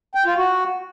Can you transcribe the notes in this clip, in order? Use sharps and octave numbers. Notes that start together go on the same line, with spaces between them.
G5
F4
F#4